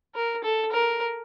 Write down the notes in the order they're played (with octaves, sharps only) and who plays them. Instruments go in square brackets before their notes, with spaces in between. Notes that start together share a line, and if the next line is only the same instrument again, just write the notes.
[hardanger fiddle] A#4
A4
A#4